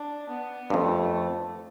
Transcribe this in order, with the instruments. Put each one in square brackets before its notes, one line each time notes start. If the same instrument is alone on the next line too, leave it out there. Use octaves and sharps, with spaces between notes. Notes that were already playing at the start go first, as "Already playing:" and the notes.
Already playing: [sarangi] D4
B3
[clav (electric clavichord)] G2
[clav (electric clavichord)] F2 [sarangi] A3